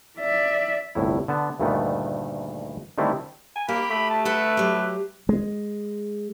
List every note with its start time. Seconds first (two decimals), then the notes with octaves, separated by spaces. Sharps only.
0.19 D5 E5
0.95 G1 C2 A2 E4
1.28 D3 B3 A5
1.60 D2 G2 A#2 D#3 A3 B3
2.98 D3 D#3 G3 A3 C4 E4
3.56 G#5
3.68 A#3 G4 B5
3.90 A3 B5
4.10 A5
4.25 A4 B4 E5 F#5
4.57 F#3 G4
5.29 G#3